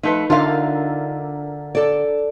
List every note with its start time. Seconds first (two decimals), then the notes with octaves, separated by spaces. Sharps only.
0.03 F3 A3 D#4 B4
0.30 D3 D4 F4 A#4 E5 F5
1.75 A4 D5